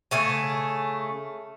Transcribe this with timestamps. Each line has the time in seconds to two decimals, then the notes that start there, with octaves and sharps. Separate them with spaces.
0.11 C#3 A3 G#5